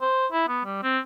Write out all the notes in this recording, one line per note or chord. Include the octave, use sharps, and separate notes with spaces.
C5
E4
B3
G3
C4